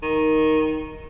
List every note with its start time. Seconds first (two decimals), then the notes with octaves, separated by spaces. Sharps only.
0.03 D#3